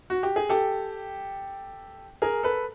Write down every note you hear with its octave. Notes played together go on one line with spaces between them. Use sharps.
F#4
G4
G#4
G4 A4
G#4 A#4
A4 B4